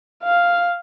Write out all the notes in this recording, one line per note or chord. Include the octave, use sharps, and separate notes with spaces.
F5